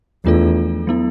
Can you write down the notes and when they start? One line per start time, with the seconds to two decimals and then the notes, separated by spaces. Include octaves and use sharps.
0.25 E2 F3 A3 D4 F4 A4
0.87 F#3 B3 E4